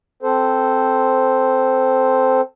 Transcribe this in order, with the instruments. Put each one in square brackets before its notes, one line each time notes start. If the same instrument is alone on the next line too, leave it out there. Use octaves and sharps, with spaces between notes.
[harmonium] C4 A4 C5